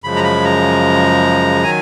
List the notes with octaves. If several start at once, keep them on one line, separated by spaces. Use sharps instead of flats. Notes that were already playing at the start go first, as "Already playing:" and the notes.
F#2 C#3 F3 G#3 B5
A#5
B5
A#5
D#3 F#3 G#5